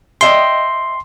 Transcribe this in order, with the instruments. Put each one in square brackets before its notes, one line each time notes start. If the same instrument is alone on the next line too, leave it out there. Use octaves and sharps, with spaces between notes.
[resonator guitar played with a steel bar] D#5 E5 G5 [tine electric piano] C6